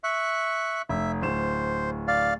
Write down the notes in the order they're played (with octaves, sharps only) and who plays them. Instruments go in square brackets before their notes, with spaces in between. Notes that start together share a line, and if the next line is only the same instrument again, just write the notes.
[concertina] E5 C#6 F#6
[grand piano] F1 [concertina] E5
[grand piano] D1 E7 [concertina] C5
[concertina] D5 F5